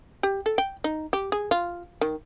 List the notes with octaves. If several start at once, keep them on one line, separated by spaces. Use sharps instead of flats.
G4
A4
G5
D#4
G4
G#4
F4
D#3